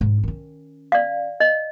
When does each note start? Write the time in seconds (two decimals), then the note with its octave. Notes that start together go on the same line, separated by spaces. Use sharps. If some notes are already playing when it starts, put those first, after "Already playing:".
0.01 G#2
0.23 D#3 C#4
0.92 D5 F5
1.40 D#5